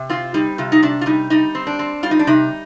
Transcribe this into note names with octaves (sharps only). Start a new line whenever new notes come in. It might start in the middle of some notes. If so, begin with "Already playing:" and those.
Already playing: C3
C4 F4
G3 D#4
C3 F4
D#4
C3 D4
F4
G3 D#4
G3 D#4
C4
D4
C4
G3 F4
D#4
D4
C3 D#4